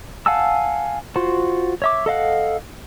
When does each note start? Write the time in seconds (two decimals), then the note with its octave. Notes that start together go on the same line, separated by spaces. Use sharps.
0.26 F5 F#5 G#5 A5 E6
1.16 F4 F#4 C5
1.82 C#5 E5 D6
2.06 A4 D#5 F5 F#5